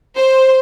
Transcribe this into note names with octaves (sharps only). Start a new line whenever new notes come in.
C5